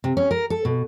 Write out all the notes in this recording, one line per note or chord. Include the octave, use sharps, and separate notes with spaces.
C3
C#4
A#4
A4
B2